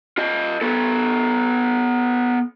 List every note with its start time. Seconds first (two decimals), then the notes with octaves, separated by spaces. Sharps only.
0.18 F4 D#5
0.61 B3 A4